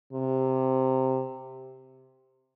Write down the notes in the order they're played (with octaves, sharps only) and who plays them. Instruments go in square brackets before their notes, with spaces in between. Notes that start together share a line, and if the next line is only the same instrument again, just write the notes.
[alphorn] C3